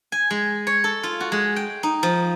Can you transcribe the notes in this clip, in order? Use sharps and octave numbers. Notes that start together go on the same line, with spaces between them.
G#5
G#3
C#5
A4
F4
F#4
G#3
G5
D#4
F3